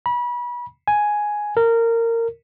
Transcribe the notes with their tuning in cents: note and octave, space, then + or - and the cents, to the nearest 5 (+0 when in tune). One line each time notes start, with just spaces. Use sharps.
B5 -30
G#5 +5
A#4 -20